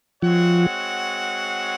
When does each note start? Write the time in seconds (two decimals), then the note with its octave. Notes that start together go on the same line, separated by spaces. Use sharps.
0.22 F3 G#3 C4 F#4 C#5 F#5